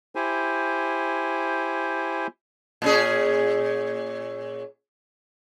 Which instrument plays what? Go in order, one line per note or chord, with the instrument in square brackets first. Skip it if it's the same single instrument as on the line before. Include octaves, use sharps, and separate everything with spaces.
[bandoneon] E4 G4 C5 G#5
[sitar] A#2 C#4 G#4